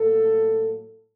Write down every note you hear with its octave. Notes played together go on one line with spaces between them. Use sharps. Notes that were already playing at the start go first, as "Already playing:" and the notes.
Already playing: A2 F#3 A#3 A4